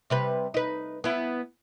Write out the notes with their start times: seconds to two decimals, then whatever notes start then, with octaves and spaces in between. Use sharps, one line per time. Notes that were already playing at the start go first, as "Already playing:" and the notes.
0.10 C3 G3 B4
0.54 D#4 B4
1.04 B3 E4